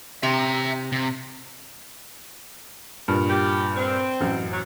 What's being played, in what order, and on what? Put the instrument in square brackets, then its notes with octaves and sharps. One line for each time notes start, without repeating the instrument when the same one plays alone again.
[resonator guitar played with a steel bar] C3 [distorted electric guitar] E5 A#5
[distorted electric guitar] C3
[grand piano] G2 A#2
[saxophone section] G3 G4
C4
[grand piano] A1 F#2
[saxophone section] F#3